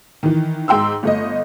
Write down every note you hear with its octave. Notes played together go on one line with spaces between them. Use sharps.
D#3 E3
G#2 G5 C6 E6
G1 A3 D#5